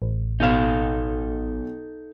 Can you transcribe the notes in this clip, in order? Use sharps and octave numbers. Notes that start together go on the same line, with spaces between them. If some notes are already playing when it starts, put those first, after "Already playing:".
A1
B1 D#4 A4 F5 E7